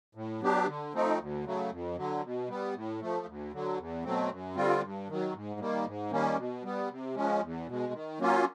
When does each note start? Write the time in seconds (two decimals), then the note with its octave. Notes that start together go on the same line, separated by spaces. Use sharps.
0.15 A2
0.40 F#3 B3 D4 G4
0.67 D3
0.93 F3 A3 C4 D#4
1.19 D2
1.44 C#3 F#3 A3
1.70 F2
1.97 D3 F#3
2.23 B2
2.48 G3 B3
2.74 A2
3.01 F3 A3
3.26 D2
3.52 D3 F#3
3.78 E2
4.04 B2 F#3 A3 C4
4.30 F#2
4.55 D3 G3 C4 F4
4.82 G2
5.08 D#3 F#3
5.34 G#2
5.60 D#3 G3 A#3
5.85 G#2
6.11 D#3 G3 A#3 C#4
6.37 B2
6.63 G3 B3
6.89 C3
7.15 F3 G#3 C#4
7.41 E2
7.67 B2 G#3
7.93 D#3
8.19 F#3 A#3 C#4 F4